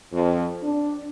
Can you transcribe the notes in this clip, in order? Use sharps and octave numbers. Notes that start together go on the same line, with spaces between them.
F2
D4